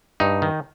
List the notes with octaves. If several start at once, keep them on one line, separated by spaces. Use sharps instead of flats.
G2 D#4
D#3